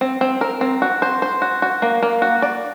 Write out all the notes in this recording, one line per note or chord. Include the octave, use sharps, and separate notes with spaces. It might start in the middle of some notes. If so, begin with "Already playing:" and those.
C4
C4
A#4
C4
F#4
C5
C5
F#4
F#4
A#3
A#3
F#4
D5